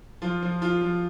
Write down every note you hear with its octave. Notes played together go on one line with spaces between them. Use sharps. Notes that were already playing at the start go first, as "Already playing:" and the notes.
F3 F4
F3
F3 F4
F3